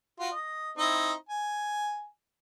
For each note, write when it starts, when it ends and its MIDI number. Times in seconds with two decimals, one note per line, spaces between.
0.20 0.31 65
0.20 0.31 66
0.32 0.71 75
0.78 1.12 60
0.78 1.12 63
0.78 1.12 64
1.29 2.05 80